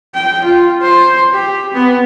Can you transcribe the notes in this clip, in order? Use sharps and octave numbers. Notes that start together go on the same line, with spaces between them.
G5
F4
C5
G4
B3